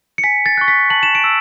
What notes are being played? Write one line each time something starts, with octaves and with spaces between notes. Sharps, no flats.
C#7
G#5 B6
A6
C#6 F#6
B6
A5 F#7
E7
D7
E6